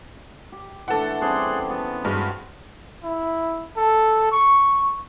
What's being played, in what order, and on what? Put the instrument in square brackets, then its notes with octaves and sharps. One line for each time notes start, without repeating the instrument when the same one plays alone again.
[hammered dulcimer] G4
[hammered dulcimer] E3 A3 D4 [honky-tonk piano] A4 F#5
[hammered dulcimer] G3 C4 C#4 [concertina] G#4 C6 F#6
[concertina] B3 [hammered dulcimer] G#4
[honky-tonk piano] G2 G#3 [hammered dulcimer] F#4
[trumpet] E4
A4
C#6